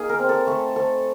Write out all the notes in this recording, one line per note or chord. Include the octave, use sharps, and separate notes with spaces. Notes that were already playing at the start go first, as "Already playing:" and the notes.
Already playing: A#3 D#4 G#4
A#4
C4
A4
A3 A4
C4 A4